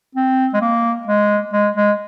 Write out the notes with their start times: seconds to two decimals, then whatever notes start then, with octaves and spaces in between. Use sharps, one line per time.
0.15 C4
0.54 G#3
0.61 A#3
1.07 G#3
1.53 G#3
1.76 G#3